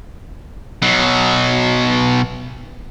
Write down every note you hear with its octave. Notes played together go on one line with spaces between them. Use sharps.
B2 F#3